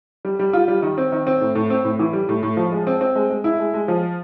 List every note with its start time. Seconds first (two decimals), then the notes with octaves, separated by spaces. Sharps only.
0.25 G3
0.39 G3
0.53 F4
0.68 G3
0.82 D#3
0.98 C4
1.12 D#3
1.27 C4
1.41 A2
1.55 A2
1.70 C4
1.85 A2
1.99 E3
2.13 G3
2.29 A2
2.43 A2
2.57 F3
2.72 G#3
2.87 C4
3.01 C4
3.15 G#3
3.30 G#3
3.44 E4
3.59 G#3
3.74 G#3
3.88 F3